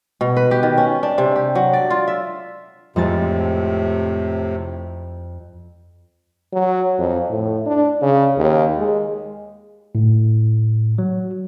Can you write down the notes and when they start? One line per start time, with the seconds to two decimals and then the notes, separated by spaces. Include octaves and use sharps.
0.21 B2
0.37 B4
0.51 G4
0.63 D#3
0.78 C#4
1.03 D4
1.18 C3
1.36 G4
1.55 F#3
1.73 D5
1.90 F4
2.08 E5
2.96 F2 A2 C3 G#3 A6
6.53 F#3
6.98 F2
7.29 A2
7.66 D4
8.02 C#3
8.37 D#2
8.78 G#3
9.95 A2
10.98 F#3